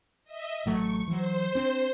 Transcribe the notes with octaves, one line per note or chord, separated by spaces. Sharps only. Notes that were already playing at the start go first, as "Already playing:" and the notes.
D#5 E5
A1 F#3 A3 C#6
E3 F#3 C5
C4 D4